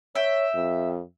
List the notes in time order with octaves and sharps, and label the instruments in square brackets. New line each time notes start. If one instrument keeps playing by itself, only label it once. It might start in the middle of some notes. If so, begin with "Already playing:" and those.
[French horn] C#5 [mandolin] E5 G5
[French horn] F2